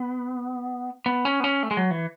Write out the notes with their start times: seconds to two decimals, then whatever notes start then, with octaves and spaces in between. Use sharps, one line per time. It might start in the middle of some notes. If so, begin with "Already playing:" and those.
Already playing: B3
1.06 B3
1.25 C#4
1.40 B3
1.44 C#4
1.63 A3
1.71 G#3
1.77 F#3
1.91 E3